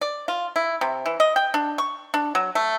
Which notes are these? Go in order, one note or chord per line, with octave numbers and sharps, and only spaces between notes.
D5
F4
E4
C3
E3
D#5
G5
D4
C#6
D4
F#3
A3